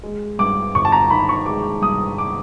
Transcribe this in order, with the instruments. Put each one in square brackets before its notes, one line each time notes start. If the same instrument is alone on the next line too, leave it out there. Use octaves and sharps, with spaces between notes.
[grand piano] G#3
G2 D6
G1 C#6
A5
A#5
D#3 B5
C#6
G#3 D6
G2 D#6
D6